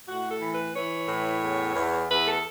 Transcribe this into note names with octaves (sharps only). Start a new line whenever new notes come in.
A2 F#4
A4
E3
B4
E3 C#5
A2
E2
E2
E2 B4
A4